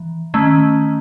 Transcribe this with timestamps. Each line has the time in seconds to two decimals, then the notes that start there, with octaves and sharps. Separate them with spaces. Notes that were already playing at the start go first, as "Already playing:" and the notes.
Already playing: E3
0.34 D#3 A3 C#4